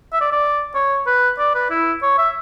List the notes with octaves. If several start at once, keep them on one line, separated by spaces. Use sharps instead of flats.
E5
D5
D5
C#5
B4
D5
B4
E4
C#5
E5